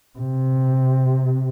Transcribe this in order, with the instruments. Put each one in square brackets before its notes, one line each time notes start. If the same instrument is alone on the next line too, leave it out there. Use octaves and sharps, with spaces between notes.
[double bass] C3